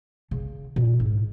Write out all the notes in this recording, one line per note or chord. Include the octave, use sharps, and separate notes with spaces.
C#3
A#2
G#2